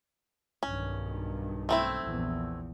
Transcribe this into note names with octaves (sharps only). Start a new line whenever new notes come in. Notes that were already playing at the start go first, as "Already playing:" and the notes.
B1 G2 D#3 C#4
A3 C4 E4
A#1 E2